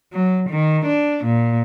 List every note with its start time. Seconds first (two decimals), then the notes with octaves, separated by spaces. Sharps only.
0.13 F#3
0.50 D#3
0.86 D4
1.25 A#2